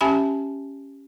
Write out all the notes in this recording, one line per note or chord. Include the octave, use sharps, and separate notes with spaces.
C#4 G4 E5 G#5 A5 B5